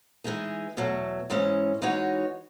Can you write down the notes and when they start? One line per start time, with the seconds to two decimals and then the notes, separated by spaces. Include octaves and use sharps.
0.24 E3 G#3 D#4 G#4
0.77 E2 B2 F#3 A3
1.30 G#2 E3 G#3 C#4
1.82 E3 G#3 D#4 F#4 C#5